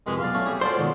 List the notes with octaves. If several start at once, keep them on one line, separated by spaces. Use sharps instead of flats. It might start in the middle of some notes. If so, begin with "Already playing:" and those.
C2 F2 G#3 B4
B1 D5 F5
A3 C#4 E4
G3 G#4
F#3 F4 A4 C5 D5
B2 D#3 G#3